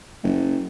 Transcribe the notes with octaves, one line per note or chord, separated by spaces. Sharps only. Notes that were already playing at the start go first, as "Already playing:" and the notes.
F#1